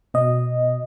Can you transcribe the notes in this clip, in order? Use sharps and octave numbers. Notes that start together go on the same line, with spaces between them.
B2 D#5